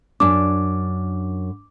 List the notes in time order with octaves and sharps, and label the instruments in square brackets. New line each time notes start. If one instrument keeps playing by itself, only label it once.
[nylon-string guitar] F#2 D4 [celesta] D6